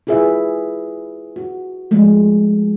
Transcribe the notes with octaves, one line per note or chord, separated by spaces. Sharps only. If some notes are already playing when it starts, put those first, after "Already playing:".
E4 F4 G#4 B4 E5
F#4
F3 G#3 A3